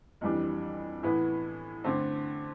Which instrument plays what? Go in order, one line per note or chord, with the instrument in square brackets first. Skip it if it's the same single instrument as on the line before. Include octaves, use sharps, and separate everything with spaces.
[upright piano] F2 E3 G3 D4
A2 E3 B3 E4
D3 A3 C4